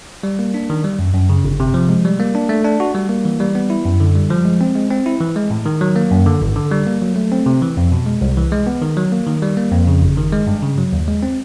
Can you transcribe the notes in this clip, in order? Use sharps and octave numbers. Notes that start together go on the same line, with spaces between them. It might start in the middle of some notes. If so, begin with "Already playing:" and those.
G3
A#3
D4
D#3
G3
F#2
F#2
C#3
G1
C3
F3
G#3
G3
A#3
D4
A3
D4
F#4
G3
A#3
E3
G3
B3
E4
F#2
D3
G3
F3
G#3
C4
G#3
C4
E4
E3
G#3
A2
D#3
F#3
A#3
F#2
D3
G#1
D3
G3
A#3
F#3
A3
C4
C3
E3
F2
B2
G#3
C2
E3
G#3
B3
D#3
F#3
A#3
D#3
G3
A#3
F2
C#3
G1
D#3
G#3
G2
C#3
F#3
D#2
G#3
C4